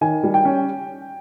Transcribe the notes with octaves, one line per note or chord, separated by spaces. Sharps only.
D#3 G#5
G3
G5
C#4